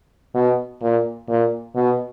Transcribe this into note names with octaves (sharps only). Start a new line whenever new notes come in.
B2
A#2
A#2
B2